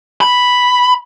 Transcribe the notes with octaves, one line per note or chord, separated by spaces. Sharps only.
B5